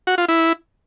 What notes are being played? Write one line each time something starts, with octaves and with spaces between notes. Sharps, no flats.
F#4
F4
E4